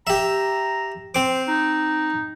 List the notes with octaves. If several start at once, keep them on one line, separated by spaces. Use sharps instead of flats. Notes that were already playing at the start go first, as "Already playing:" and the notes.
G4 E5 A#5
C4 C5 D6
D#4